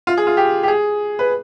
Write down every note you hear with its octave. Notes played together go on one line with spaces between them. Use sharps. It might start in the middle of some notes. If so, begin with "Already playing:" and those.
F4
G#4
F4
G4
G4
G#4
B4